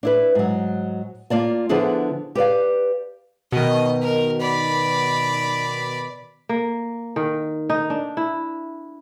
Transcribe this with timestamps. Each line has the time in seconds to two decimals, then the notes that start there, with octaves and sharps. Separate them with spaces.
0.03 D4 E4 B4
0.35 G#2 F#3
1.30 A#3 F4 D5 A5
1.69 D3 F3 B3 D4 E4 G#4
2.35 G4 B4 D5 F5
3.52 B2 D#3 D#5
4.02 A#4
4.41 D5 B5
6.49 A#3
7.16 D#3
7.70 D#4
7.90 D4
8.17 E4